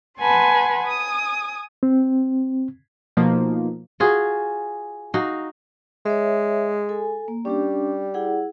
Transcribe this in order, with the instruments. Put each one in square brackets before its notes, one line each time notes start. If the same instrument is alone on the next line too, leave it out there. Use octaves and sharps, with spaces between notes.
[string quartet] B4 F#5 G#5 A5 C6
G#5 D#6
[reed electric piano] C4
[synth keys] B2 F3 A#3 D#4
[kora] F4 F#4 G#4
D#4 F#4 F5
[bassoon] G#3 [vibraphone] C#5 E5
[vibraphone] A4 G#5
A#3
[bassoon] G3 [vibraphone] C#4 D4 G4
[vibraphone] E4 G#4 F#5